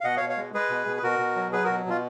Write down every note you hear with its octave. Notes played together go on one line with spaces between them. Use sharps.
F5
B2 D#5 F#5
C#5 F5
B2
C#5 F5
G#3
G#3 G#4 B4
B2
B2
B4
B2 F#4 A#4
B2
F#3
F#3 G#4 B4
B2 F#4 A#4
B2 F4